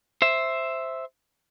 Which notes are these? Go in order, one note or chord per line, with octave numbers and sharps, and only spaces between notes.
C5 E5